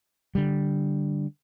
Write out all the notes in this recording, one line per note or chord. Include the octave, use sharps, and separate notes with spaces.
D3 G3